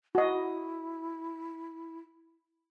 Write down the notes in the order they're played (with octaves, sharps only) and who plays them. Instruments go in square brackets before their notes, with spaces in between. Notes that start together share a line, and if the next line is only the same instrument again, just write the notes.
[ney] E4 [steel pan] F#4 D#5